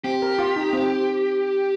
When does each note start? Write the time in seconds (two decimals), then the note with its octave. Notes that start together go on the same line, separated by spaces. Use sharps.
0.04 C4 G4
0.22 A#4
0.39 F4
0.56 D#4
0.73 C4